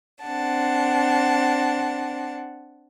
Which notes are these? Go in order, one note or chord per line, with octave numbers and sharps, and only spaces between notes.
C4 D4 F#5 A5